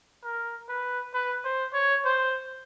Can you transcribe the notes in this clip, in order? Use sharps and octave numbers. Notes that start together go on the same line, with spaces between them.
A#4
B4
B4
C5
C#5
C5